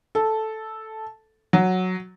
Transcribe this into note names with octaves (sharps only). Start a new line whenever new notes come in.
A4
F#3